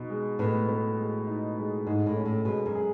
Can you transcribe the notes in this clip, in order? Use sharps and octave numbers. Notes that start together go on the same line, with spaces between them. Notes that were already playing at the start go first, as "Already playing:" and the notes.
Already playing: B2 D#4
G#3
A2 B3
B3
G#3
D#4
G#3
G#2 G#3
A2
C#4
A2
B2 G#3
F#2
G#4